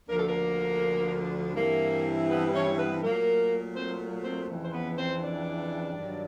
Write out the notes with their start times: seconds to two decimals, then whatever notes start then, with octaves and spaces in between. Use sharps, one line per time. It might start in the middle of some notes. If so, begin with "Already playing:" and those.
0.08 D2 D3 F3 A#3 D4 A#4
0.17 A4
0.27 A#3 A#4
1.54 G2 E3 G3 A#3 C4 E4 A#4
2.28 B3 B4
2.52 C#4 C#5
2.76 B3 B4
3.01 A#2 F#3 A3 A#3 A#4
3.75 C4 C5
4.24 C4 C5
4.48 F2 C#3 E3
4.63 C5
4.73 B3 B4
4.97 C4 C5
5.21 D4 D5
5.95 G2 D#3 F#3